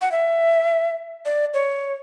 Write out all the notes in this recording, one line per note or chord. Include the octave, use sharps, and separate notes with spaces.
F#5
E5
D5
C#5